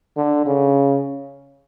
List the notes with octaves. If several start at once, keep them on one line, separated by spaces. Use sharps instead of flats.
D3
C#3